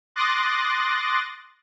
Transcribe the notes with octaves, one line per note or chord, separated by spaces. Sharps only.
C6 D6 D#6 F#6 A6 A#6